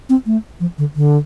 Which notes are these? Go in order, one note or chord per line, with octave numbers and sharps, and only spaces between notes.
C4
A3
F3
D3
D3